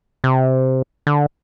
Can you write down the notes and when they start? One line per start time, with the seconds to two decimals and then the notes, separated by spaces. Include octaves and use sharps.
0.24 C3
1.07 D3